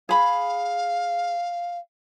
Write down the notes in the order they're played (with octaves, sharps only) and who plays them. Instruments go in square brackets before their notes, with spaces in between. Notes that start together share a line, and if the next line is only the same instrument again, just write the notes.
[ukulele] G#4 B5 [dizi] F5